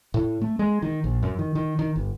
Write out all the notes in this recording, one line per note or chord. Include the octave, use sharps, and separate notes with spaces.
A2
A3
G#3
D#3
A#1
F#2
D#3
D#3
D#3
G1